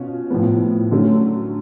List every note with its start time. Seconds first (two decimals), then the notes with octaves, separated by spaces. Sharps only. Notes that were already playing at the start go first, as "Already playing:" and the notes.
Already playing: B2 C#4 F4
0.30 A2 F3 B3
0.91 D3 F#3 A3 C#4